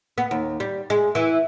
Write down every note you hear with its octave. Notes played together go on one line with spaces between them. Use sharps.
B3
D#2
G3
G#3
E3